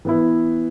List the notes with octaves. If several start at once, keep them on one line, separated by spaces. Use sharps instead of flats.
E3 B3 E4